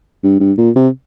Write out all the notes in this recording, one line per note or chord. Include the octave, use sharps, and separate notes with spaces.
G2
G2
A#2
C3